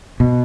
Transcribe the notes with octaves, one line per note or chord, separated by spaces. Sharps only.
B2